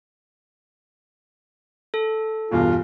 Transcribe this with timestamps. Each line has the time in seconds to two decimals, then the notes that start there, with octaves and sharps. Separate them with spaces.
1.94 A4
2.51 E2 G2 B2 F4